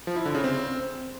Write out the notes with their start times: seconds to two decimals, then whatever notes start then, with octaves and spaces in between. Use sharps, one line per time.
0.07 F3
0.16 E4
0.25 D3
0.35 C#3
0.44 C4